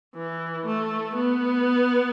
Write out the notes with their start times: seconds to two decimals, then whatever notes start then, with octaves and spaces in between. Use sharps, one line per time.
0.15 E3
0.66 A3
1.17 B3